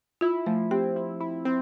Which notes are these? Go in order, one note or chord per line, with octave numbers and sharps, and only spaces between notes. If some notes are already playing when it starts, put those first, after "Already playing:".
E4 F4
F3 A3
C4 G4
E4
E4
C4